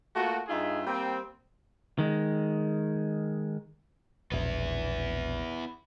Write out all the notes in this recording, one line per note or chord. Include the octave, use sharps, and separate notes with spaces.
A3 A#3 F4 F#4
G2 D#4 F4 G#4 E5
G3 A#3 C4
D#3 G#3
E1 A#1 B3 E4